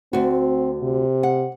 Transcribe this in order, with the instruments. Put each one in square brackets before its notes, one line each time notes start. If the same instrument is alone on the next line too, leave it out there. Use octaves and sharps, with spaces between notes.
[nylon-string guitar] D2 F#4 [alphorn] C4
[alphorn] C3
[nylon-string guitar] F#5